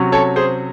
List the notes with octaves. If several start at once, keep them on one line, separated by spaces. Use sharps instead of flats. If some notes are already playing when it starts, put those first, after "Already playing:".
Already playing: C3 F#3 C#4
A4 C#5
G#4 C5